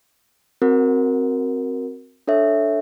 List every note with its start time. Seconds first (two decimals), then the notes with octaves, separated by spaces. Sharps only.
0.62 C4 F#4 A#4
2.27 D4 A4 C#5 E5